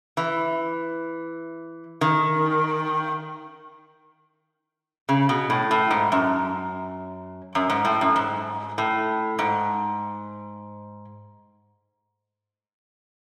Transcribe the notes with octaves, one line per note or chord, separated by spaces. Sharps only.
E3
D#3
C#3
B2
A2
A2
G#2
F#2
F#2
G#2
A2
F#2
G#2
A2
G#2